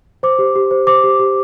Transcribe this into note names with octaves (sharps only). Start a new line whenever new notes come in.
C5 D6
G4
G4
C5
C5 D6
G4
G4